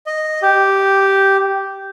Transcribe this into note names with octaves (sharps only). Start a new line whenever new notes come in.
D#5
G4